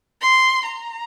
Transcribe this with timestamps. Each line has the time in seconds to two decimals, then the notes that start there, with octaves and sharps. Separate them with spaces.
0.21 C6
0.66 A#5